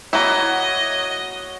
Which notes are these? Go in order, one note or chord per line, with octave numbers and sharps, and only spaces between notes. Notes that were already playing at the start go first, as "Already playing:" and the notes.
A#3 E4 F#4 C#5 D#5